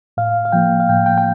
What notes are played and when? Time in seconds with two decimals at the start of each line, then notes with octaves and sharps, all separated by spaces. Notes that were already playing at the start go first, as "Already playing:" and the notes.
0.17 A2 F5
0.45 F5
0.52 F3 A#3 G5
0.80 F5
0.89 A2 G5
1.06 G5
1.18 G5